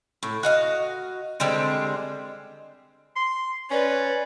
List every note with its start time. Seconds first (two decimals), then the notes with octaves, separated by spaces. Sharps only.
0.23 A2
0.43 F#4 D#5 F5
1.40 D3 G3 G#3 C4
3.16 C6
3.71 C#4 B4 D5